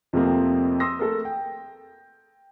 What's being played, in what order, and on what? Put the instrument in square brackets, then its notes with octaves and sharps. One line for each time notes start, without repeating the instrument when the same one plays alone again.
[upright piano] F2 C3 F3 A3 A#3 C4
C6 D#6 E6 A#6
A3 A4 A#4
G5